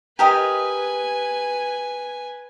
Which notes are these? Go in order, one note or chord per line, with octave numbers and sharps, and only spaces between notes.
G4 A#4 B4 D#5 G#5